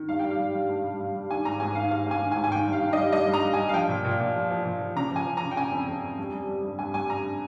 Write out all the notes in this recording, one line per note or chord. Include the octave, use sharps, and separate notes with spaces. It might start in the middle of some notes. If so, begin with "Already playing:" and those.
Already playing: D#3
G2 F5
G3 G5
F5
G3
G3
G2
G3
G2
G3
D#3 G#5
G#2 A#5
G#2 G#5
D#3 F5
G#2 F5
G#2 G#5
D#3
G#5
G#2
G#5
D#3 G5
G2
F5
D#3
D#5
G3
G2 D#5
G2
A#5
G3
G#5
G3
F5
F3 G5
A#2
A#2
A#2
F3
F3
A#2
F3
C#3 A#5
F3 G#5
F3
C#3 A#5
G5
C#3 G#5
F2
F2
F2
G2
G3
G3
G2
G2 G#5
G3 G#5
G2 A#5